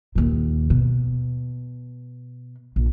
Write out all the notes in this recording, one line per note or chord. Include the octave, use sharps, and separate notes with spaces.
D#2 A#2
B2
A#1